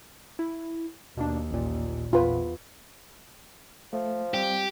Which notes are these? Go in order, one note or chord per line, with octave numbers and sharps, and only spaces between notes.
E4
D#2 B2 A#3 D4
A1 A#2
E2 F4 B4
F3 A3
G3 C4 G4